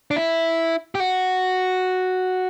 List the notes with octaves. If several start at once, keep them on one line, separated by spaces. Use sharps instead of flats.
D4
E4
G4
F#4